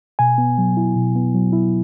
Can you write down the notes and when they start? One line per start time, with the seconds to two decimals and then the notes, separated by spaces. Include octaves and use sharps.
0.19 B2 G#5
0.38 B3
0.58 F#3
0.77 E4
0.95 B2
1.16 B3
1.34 F#3
1.53 E4